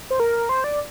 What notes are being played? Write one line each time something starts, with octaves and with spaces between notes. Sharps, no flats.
C5
A#4
C5
D5